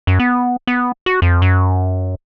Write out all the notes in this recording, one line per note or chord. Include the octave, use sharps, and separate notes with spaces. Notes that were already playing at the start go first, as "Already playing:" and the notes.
F#2
B3
B3
F#4
F2
F#2